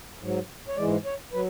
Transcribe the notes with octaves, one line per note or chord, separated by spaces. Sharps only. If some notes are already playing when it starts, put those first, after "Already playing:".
G#2 F#3
C#5
G#2 E3 G#3 D5
C#5
F#3 B4